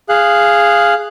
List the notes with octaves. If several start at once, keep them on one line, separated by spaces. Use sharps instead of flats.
G#4 F5 F#6